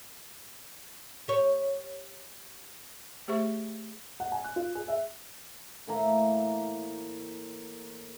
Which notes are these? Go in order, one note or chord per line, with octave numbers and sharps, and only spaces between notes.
G4 C#5
A3 G4 G#4 C5 E5 C#6
F#5
G#5
F#6
F4
G#4
E5
A2 E3 A#3 A#5